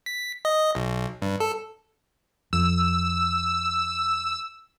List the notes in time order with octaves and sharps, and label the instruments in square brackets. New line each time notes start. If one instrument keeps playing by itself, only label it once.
[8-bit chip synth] B6
D#5
B1
G2
A4
[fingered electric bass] F2 [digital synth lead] E6